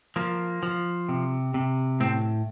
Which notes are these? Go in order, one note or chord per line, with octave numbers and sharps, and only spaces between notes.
F3 A#3
F3
C3
C3
A2 C4